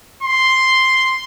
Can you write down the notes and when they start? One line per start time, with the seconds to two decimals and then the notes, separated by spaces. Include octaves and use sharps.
0.23 C6